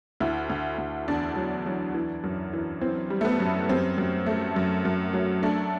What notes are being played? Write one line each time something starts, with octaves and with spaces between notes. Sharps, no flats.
D2 E4
D2
D2
E2 D4
F#3
F#3
E3
F#2
E3
E3 C4
G3
A3
B3
F#2
F#2 C4
F#2
A3
F#2
F#2
F#3
A3 D4